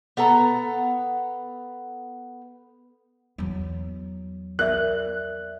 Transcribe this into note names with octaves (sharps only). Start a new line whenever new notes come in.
B3 A4 F#5 A#5
E2 F#3
A#4 D5 E5 F#6